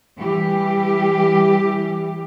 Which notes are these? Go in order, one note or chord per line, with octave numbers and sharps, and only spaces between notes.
E3 G3 G4